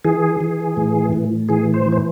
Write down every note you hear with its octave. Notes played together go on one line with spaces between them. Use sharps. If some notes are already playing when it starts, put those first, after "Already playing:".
E3 G#4
E3
A2
A2
E3 G#4
C5
E3
C5